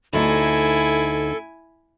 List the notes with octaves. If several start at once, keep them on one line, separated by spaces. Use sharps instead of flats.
D2 D#4 E4 A4 G#5